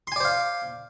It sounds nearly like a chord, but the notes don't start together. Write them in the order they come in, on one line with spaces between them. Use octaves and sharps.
C6 G#5 D5 C5 F5